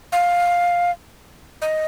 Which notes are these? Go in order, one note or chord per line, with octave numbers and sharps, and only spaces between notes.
F5
D#5